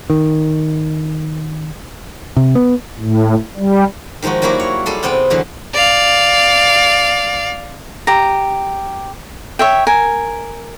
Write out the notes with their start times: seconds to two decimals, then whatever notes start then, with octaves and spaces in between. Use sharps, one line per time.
0.10 D#3
2.37 C3
2.55 B3
2.99 A2
3.57 G3
4.22 D#3 F3 G#3 D#4 F#4
4.42 F#3 G3 A#3 E4 F#4
4.60 C#5
4.86 G3 G#4 A4 C6
5.03 C3 B3 C4 G#4 G5
5.30 D3 E3 F#3
5.74 D5 F5
8.07 G4 A#5
9.59 C#5 E5 G5
9.87 A#4 G#5